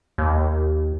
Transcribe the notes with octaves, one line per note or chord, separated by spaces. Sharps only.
D#2